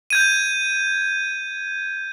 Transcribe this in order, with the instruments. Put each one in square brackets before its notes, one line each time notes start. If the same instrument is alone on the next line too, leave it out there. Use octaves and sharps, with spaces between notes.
[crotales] G6 G#6 D#7